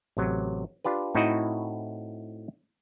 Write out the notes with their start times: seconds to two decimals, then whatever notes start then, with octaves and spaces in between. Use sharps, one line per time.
0.17 A1 C3 F#3
0.84 D4 F4 G4 B4
1.15 A2 C4 D#4 E4 F#4 D#5